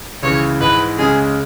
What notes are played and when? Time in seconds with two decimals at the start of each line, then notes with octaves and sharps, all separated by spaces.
0.23 C#2 C#3 E3 C#5
0.61 G#2 E3 G#3 B4
0.98 C#2 C#3 G#3 C#4 G#4